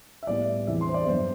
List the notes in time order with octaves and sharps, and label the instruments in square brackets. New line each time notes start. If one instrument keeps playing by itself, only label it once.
[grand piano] E5
A2 G3 B3 D5
E2 C3 E3 E5
C6
C5
D5
G2 F#3 B3 C5